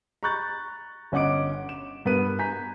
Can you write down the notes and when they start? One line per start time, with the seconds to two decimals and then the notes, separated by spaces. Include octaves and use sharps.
0.23 A#5 B5 C#6 F#6 G6 A6
1.12 G1 C#4 D#5 F#5 D6 D7
1.69 E7
2.05 G2 B3 A#4 B4 D#7
2.39 G#5 A#5 G6 B6